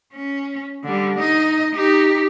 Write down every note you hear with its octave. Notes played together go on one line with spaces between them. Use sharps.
C#4
D3 G3
D#4 D#5
D#4 G4